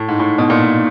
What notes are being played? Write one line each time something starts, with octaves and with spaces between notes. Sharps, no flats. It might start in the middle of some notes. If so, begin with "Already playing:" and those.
Already playing: A2
G#2
A2
B2
A#2